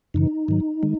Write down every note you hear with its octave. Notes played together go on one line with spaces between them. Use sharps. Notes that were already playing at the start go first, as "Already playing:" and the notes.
F#2 C#3 E3 D#4
G#2 D#3 F#3
D#3 G#3